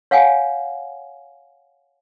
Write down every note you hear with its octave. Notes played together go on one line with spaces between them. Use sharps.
C#5 F5 F#5 G#5